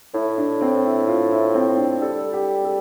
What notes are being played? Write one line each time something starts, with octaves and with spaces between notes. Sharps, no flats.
A2 E4
D4
C4
E4
F4
E4
C4
D4
G3 A4
G4
A4